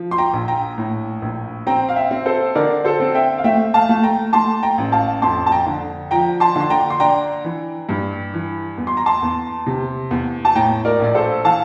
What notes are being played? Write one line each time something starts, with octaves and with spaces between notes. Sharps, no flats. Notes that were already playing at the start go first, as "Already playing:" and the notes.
Already playing: F3
C6
G5 A#5
A#1
G5 A#5
A2
A#1
C4 G5 A#5
F5
E5 G5
C4
A4 C5
D3 A#4 D5
A4 C5
C4
E5 G5
F5
A3 E5 G5
F5 A5
A3
G5 A#5
A3 A5 C6
G5 A#5
A1
F5 A5
F2 A5 C6
A5
G5 A#5
D3
F3 G5 A#5
A5 C6
D3 C6
G5 A#5
C6
D4 G5 A#5
E3
G2
E3
E2
C6
A#5
A5 C6
E2
C3
E2
A5
A2 G5 A#5
A#4 D5
A#1 D5
A4 C5
E3 F5 A5